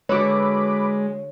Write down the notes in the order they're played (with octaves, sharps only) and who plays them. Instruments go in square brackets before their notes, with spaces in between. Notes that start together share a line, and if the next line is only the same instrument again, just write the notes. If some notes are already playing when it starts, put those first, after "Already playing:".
[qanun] D3 F#4 A4 [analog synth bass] G#3 [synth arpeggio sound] B4 B5 D6 [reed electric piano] C#5